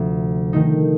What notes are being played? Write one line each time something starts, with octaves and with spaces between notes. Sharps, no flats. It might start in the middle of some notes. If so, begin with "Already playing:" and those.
Already playing: D2 C3 F3
D#3 A3 D#4